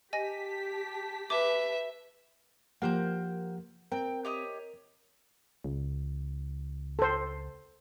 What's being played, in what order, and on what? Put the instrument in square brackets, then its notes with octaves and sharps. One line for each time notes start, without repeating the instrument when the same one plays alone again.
[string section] G4 A5 B6 [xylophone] D#5 G#5 A#6
[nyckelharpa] B4 [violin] E5 [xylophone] D6
[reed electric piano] F3 G4 F#5 [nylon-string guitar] A#3 [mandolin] A#4 C5 G6
[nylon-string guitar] C4 [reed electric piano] A#4 [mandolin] G5
[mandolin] G4 C#5 D#5
[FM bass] C#2
[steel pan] A4 C5